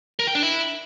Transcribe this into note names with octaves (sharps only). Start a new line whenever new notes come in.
A#4
G5
D4
E4